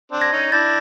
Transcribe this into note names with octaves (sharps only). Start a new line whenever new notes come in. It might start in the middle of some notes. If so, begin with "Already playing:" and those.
C4 D4
G#6 A#6
C#4 D#4
D4 E4 G6 A6